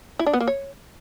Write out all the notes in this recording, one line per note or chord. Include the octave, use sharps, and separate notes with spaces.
E4
D4
B3
A#3
C#5